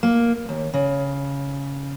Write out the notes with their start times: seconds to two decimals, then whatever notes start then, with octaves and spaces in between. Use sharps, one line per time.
0.03 A#3
0.49 D#2
0.74 C#3